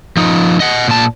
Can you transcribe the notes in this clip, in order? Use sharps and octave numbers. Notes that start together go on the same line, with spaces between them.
F3 D#4
D#5 F#5
A#2 A5